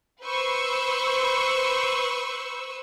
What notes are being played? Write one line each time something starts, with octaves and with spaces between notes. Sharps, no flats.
B4 C5 C#6 E6